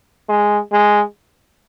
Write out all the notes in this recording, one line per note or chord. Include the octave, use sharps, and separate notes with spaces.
G#3
G#3